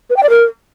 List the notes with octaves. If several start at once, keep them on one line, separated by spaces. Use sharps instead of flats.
B4
G5
D5
A#4